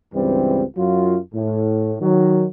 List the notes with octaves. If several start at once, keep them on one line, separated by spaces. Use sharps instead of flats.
C#2 G2 E3 G3 C4
F#2 F#3 F4
A2
D#3 F#3